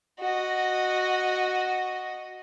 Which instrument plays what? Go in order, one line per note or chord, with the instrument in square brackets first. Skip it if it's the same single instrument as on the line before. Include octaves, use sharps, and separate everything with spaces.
[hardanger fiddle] F#4 D#5